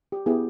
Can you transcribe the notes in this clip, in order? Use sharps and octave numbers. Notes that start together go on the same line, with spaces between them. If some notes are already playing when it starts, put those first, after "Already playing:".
G4
B3 E4 G4 G#4